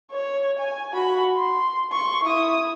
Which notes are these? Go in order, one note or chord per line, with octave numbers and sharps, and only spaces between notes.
C#5
G#5
F#4 B5
C6
C6 C#6
E4 D#6